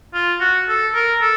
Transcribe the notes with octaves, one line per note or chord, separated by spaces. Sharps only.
F4
F#4
A4
A#4
A4